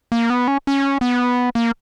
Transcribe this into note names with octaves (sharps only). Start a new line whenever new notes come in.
A#3
B3
C#4
C#4
B3
A#3